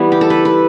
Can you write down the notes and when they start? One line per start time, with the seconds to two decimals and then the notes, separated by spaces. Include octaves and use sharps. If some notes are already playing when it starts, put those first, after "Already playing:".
Already playing: E3 G3 B3 E4
0.12 G4
0.21 A4
0.30 B4
0.45 B4